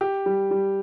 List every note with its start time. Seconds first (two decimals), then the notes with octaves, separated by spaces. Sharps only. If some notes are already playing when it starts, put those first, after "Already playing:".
0.01 G4
0.26 G3
0.51 G3